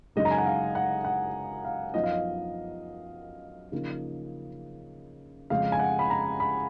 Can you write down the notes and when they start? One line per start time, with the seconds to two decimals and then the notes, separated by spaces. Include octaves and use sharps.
0.16 F#2 C#3 G#3 D#4 D#5
0.25 A#5
0.31 G#5
0.38 F#5
0.46 F5
0.75 F#5
1.05 F#5
1.65 F5
1.94 F#2 F3 B3 D#4 D#5
2.04 F5
2.12 D#5
3.72 C#3 F3 A#3 D#4
5.50 F2 C#3 G#3 C#4 F5
5.72 G#5
5.79 F#5
5.99 B5
6.10 A#5
6.40 B5